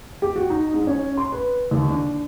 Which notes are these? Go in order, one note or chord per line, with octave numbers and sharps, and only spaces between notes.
G4
F#4
D#4
G#2
C#4
C6
B4
D#2
D4